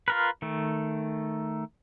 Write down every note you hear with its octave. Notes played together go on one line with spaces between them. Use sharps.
F4 A#4 B4
D#3 A3